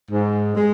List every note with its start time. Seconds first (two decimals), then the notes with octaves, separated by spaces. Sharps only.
0.11 G#2
0.56 G#3